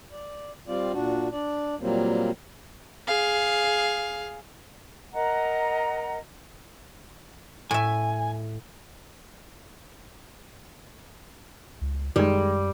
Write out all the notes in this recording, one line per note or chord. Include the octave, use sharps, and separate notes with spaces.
D5
G3 C4 F4 D5
A#2 D4 F#4
D4 D5
A#2 F#3 G3 A#3 C4
G#4 F5
A#4 D#5 F#5 A#5
A2 E5 G#5
C#2
F#2 D#3 G3 G#3